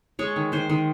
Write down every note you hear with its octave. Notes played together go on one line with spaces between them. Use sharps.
G#3 C#5
D#3
D#3 C5
D#3